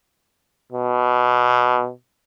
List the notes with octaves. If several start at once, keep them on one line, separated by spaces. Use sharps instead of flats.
B2